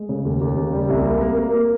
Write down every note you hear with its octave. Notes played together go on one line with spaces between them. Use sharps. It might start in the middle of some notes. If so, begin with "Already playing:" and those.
Already playing: G#3
C#3
D#2
D#2
C#3
G3
C2
A#3
A#3
A#3
A#3